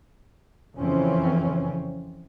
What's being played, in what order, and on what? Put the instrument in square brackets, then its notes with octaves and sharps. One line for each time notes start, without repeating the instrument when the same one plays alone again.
[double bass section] F2 C#3 E3 C4 C#4